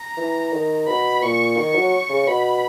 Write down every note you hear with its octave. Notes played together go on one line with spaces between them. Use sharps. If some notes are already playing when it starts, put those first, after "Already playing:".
Already playing: A#5
E3
D#3
B2 B5
A#2 C#6
D#3 C#6
F#3
C#3
B2 B5